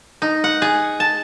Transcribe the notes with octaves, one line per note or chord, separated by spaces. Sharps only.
D#4
F#5
G#4
A5